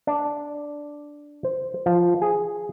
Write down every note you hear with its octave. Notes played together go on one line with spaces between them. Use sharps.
D4
C5
F3
G#4